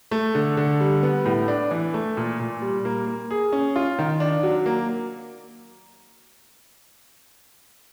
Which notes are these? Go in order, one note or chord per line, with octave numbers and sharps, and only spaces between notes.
A3
D3
D3
G3
B3
A2
D4
E3
A3
A#2
A#2
G3
A#3
A#3
G#4
C#4
F4
D#3
D4
F#3
A#3